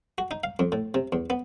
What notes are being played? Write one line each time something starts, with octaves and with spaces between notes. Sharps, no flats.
F#4
D#4
F5
F2
A2
C3
E2
B3